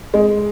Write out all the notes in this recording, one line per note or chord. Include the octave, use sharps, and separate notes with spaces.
G#3